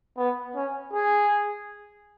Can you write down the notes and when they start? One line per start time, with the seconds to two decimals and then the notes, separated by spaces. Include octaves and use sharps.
0.17 B3
0.55 C#4
0.93 G#4